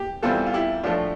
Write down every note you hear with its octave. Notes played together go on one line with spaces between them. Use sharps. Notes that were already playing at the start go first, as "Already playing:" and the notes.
Already playing: G4
E2 E3 G3 C4 F4 A4
F4
E4 G4
A2 F3 A3 D4 F4